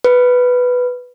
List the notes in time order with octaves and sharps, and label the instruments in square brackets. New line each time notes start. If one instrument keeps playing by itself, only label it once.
[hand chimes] B4